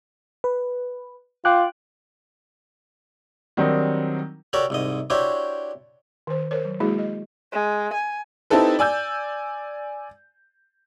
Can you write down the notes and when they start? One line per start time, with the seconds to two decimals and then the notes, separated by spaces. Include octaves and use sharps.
0.44 B4
1.45 F4 G5 D6 F#6
3.57 D#3 F#3 G3 C4 D4 D#4
4.53 F#4 G4 A4 A#4 C#5 D5
4.70 C2 G#2 D#5
5.10 D4 E4 F#4 G4 C5 C#5
6.27 D#3 C5
6.51 A#4 C5 C#5
6.65 F#3
6.80 G#3 A#3 E4 F#4 G#4
6.99 D#5
7.52 G#3
7.93 G#5
8.50 C4 D#4 E4 G4 A4 B4
8.79 D5 G#5 E6 G6